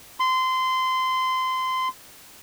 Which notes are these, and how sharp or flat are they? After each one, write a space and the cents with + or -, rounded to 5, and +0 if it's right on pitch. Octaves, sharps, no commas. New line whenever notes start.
C6 -20